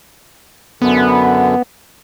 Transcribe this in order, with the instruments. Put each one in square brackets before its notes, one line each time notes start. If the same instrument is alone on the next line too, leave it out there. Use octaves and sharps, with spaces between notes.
[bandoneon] F#2 D3 [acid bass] B3